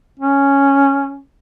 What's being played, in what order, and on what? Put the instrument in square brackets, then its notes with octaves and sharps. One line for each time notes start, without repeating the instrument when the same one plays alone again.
[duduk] C#4